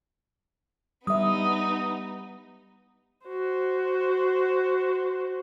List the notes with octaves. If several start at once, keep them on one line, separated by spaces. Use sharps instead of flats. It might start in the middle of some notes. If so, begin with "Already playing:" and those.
G3 B3 D#4 E5 D#6
F#4 C5